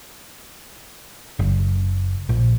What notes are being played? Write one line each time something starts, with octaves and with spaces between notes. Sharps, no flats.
F#1
A#1